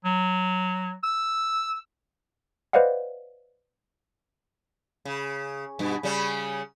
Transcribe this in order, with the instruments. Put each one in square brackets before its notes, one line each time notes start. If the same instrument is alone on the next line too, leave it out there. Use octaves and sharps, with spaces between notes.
[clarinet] F#3
E6
[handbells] B4 C5 D5 D#5 F5 F#5
[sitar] C#3
G2 B2
C#3 G3 C#4